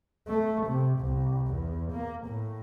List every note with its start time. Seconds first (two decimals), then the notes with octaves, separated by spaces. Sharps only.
0.28 A3
0.67 C3
0.99 C2
1.47 E2
1.92 A#3
2.26 A2